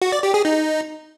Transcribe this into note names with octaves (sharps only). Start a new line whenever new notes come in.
F#4
D5
G4
G#4
D#4